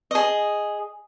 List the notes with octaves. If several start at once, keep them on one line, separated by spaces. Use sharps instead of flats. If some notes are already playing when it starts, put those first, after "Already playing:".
G#4 D#5